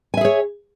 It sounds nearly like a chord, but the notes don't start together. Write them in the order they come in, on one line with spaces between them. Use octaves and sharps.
G#5 E5 G#4 C#5